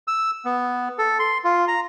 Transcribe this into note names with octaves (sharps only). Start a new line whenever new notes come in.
E6
B3
A4
C6
F4
A#5